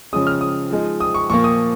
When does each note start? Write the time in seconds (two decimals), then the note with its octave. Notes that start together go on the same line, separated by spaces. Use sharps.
0.13 C#3 F3 G#3 C#4 D#6
0.27 F6
0.41 D#6
0.71 F3 G#3 D#4
1.00 D#6
1.14 C#6
1.30 A#2 F3 A#3 C#6
1.44 D#6